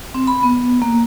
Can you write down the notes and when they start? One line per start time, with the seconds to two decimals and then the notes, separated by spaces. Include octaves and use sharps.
0.15 C4
0.27 B5
0.43 B3
0.82 A#3